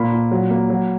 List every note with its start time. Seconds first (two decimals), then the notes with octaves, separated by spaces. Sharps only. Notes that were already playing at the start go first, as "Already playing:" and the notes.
Already playing: A#2 A#3 B5
0.12 A#2
0.31 F#3
0.50 A#3
0.70 F#3